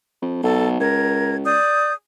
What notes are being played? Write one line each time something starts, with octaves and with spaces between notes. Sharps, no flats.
F2
B1 A4
C#2 A#4 G#6
D5 D#6 G6